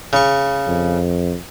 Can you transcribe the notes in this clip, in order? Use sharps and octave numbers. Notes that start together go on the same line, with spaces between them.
C#3 C#6
F2